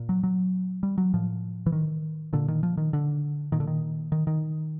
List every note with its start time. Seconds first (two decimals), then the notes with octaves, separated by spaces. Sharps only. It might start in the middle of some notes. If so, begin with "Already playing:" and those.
Already playing: A#2
0.09 F#3
0.23 F#3
0.83 G3
0.98 F#3
1.14 A2 F3
1.66 E3
1.72 D#3
2.33 A#2 D3
2.48 D#3
2.63 F3
2.77 D#3
2.93 D3
3.52 A#2 D#3
3.60 D3
3.67 D#3
4.12 D#3
4.27 D#3